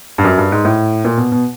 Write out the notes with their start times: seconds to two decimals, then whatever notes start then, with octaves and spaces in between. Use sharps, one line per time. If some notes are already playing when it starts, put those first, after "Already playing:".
0.18 G2
0.24 F#2
0.38 G2
0.52 G#2
0.65 A2
1.05 A#2
1.18 B2
1.32 B2